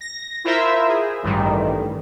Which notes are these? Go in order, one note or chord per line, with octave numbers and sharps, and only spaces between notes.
A#6
E4 F4 A#4 C5 E5
G#4
A1 G2 D#3 G3